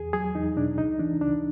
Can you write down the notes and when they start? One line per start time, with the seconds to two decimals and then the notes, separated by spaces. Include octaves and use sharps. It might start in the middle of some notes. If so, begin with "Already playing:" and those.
Already playing: E2 G#4
0.13 F#3 G#4
0.35 E2 D#4
0.56 B2 D4
0.78 C#2 D#4
1.00 E3 D4
1.21 C#2 D4